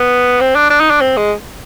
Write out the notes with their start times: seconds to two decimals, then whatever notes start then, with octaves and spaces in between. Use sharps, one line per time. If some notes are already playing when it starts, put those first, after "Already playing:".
Already playing: B3
0.41 C4
0.55 D4
0.70 D4
0.80 D#4
0.90 D4
1.01 C4
1.17 G#3